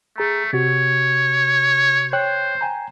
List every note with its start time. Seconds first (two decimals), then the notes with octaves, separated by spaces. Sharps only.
0.18 A3 G#4 A#5
0.53 C3 F#4 C#5
2.13 C5 C#5 G5 F#6
2.61 G5 G#5 A#5